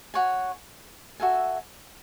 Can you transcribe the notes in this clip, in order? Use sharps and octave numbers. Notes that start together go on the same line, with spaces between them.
F#4 C#5 G#5
F#4 A4 E5 G#5